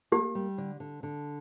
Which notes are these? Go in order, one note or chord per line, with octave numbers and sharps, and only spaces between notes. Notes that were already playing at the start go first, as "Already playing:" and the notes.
A#3 G4
G3
D3
D3
D3